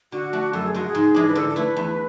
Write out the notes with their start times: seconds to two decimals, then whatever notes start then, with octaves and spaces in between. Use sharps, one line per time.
0.12 D3 F#4
0.33 A3 D4
0.53 F#2 A4
0.65 G#4
0.74 C#3 G#3 F#4
0.87 G#4
0.95 G#2
1.15 E3 G#3 D4
1.27 B4
1.35 D3 A4
1.49 A4
1.56 A3 E4 B4
1.77 E2